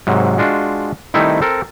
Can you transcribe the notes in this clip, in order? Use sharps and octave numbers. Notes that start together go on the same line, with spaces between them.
G#2 C3 F#3
G#3 D4 F4 F#4
D#3 G3 A3 C4 D#4 E4
C4 A4 A#4